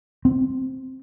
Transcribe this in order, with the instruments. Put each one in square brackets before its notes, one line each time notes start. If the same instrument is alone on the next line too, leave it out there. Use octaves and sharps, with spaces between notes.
[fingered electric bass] C4